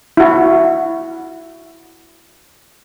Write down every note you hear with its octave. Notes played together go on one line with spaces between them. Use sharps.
E4 F#4